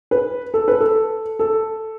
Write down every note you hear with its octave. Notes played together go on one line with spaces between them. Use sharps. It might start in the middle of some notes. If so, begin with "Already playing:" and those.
B4
A4
B4
A4
A4